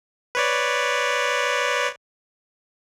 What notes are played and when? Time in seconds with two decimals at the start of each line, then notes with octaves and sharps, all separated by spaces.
0.35 B4 C#5 D5